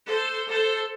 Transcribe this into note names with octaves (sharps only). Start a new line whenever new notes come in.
A4 C5
A4 C5